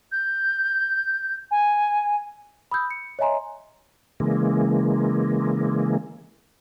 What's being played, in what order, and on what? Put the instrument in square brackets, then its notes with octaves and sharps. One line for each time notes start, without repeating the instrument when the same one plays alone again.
[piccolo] G6
G#5
[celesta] B5 D#6 E6 G6
C#7
C#5 D#5 E5 G#5 A#5 C6
[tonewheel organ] C#3 E3 G#3 A#3